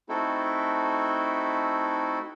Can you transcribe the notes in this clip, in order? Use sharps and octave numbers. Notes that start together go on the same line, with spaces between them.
A3 C4 D#4 E4 F#4 A4